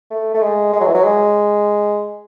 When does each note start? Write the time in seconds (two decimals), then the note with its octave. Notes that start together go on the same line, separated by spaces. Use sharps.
0.10 A3
0.34 A3
0.42 G#3
0.73 G#3
0.80 F#3
0.87 E3
0.94 F#3
1.04 G#3